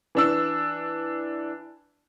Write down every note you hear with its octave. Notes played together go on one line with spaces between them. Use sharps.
E3 D4 E6